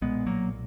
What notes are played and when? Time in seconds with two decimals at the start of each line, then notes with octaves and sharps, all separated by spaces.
0.02 B1 A#2 G#3 B3
0.26 F#3 A#3